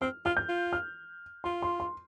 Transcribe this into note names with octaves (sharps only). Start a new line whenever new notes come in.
C4 F6
F4 F6
G6
F4
F6
F4 C6
C6
C6